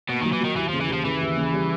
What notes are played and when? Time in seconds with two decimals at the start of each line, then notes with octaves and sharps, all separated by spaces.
0.09 B2 A#3
0.21 D#3 F#3
0.33 E3
0.41 D#3 F#3
0.57 D#2 E3
0.69 C#3 F3
0.81 E3
0.89 D#2 F3
1.05 C#3 E3
1.21 D#2
1.37 C#3
1.53 G3